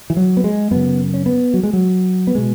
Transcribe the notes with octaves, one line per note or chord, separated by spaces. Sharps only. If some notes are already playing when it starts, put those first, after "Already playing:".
E3
F#3
B3
G#3
F#2 C#3 B3
C#4
B3
F#3
G#3
F#3
B3
B2 G#3